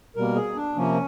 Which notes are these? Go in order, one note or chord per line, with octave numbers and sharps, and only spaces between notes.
B2 G3 A#3 A#4
G#4
D4
C3 F3 A#3 C#4